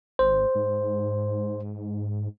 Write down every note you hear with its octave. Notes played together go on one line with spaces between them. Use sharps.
G#1 C5
G#2